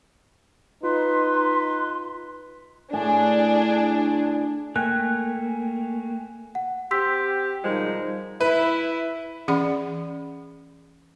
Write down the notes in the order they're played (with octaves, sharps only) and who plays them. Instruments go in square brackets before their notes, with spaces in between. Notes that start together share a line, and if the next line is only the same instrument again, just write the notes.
[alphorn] D#4 [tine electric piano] F4 [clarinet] B4 [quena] C6
[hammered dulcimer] A2 G#5 [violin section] D4 G#4
[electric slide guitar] A3 A#3 [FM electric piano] G5 G#5 [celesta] F#6
[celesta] F#5
[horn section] C4 G4 [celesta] C6 E6 B6
[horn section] B2 D#3 G#3 [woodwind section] F3 G3 D#4
[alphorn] E4 [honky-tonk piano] B4
[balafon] E3 C#4 G#4 D5 F#5 B5